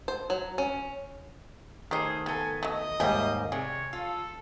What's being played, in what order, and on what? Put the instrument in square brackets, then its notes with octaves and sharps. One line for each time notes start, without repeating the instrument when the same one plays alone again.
[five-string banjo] C5
F#3
C#4
[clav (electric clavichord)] D#3 C#5 [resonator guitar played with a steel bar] A3 C5 [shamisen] G4 D#5 [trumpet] G#4
[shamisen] A3 [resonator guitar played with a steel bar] B3 A4 [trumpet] G#5
[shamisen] F#3 A3 [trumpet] D#5
[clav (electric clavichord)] D#2 G#2 G3 [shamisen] G#4 [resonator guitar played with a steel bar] C5 E5 G5
[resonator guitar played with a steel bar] C3 [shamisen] G#4 [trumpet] C#5 [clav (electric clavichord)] D5
[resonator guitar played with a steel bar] F4 [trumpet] A4 [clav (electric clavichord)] F5